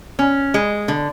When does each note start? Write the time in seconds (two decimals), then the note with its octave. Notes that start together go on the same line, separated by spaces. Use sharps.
0.19 C#4
0.54 G#3
0.88 D3